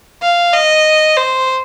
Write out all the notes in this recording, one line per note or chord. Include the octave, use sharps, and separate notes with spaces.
F5
D#5
C5